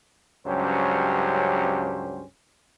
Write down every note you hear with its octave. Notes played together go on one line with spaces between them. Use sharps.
C#2 G2 F#3 C#4 G4 C5